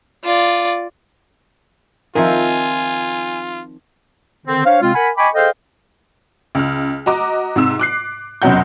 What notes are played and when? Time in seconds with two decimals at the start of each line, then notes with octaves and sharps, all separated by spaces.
0.24 F4 D5
2.15 D#3 F3 C4 F4 A#4 E5 G#5
4.46 D3 D#3 C4
4.65 D4 C5 C#5 F5
4.82 C3 G#3 C4 F4
4.95 A#4 F#5 G#5 B5
5.18 D#5 G5 G#5 B5 C#6 D6
5.35 G#4 A4 C5 D#5 F5 G5
6.55 C#2 F6
7.06 F#4 D#5 A#5 D6
7.56 G#2 C3 E6
7.79 D6 F#6 C7
8.42 F1 F#2 B2 F#3 F#5 G6